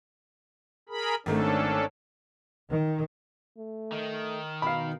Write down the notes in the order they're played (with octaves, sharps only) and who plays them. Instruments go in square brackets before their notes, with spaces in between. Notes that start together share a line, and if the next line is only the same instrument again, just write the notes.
[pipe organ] G#4 A#4 B5
[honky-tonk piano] G#1 D#3 A3 [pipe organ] C#4 D4 A4
[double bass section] D#3
[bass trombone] A3
[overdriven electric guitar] D#3
[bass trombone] B2 [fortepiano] F5 B5